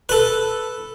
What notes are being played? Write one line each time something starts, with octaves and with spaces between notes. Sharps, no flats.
A4 B4